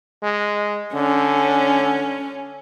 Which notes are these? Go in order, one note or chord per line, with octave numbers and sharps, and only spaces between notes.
G#3
D3 C#4